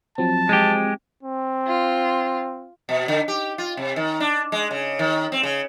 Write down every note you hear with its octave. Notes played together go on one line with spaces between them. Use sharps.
F3 F#3 C4 A5
G#3 G4
C4
F4
B2
D3
G4
F4
C3
D#3
D4
G#3
C#3
D#3
C4
C#3